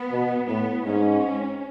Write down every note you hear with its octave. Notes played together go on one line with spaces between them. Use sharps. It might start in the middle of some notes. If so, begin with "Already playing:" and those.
Already playing: B3
B2
A2 B3
G#2 C#4